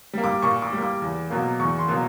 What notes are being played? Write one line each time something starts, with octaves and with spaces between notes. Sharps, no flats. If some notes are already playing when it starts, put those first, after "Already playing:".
G3 A#3
D6
A#2 C#6
D6
G3 A#3
D6
E2
B2 F#3 A#3
E2 C#6
C6
B2 F#3 A#3